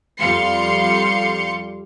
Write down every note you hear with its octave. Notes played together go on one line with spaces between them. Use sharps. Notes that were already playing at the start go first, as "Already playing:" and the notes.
F2 G3 F5 C6 C#7